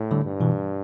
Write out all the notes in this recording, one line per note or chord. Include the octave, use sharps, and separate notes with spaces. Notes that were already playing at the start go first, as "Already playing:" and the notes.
Already playing: A2
D3 G3
G2
B2 E3